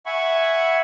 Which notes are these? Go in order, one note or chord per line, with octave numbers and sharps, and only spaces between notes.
E5 F#5 G#5 B5 C#6